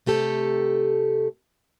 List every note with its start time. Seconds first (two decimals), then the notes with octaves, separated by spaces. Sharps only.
0.06 C3 A3 G4 A4